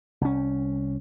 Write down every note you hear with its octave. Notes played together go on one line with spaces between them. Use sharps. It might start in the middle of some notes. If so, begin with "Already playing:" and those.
C2 C#4